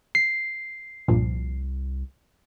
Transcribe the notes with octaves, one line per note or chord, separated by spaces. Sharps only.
C7
C2 G2 A#2 F3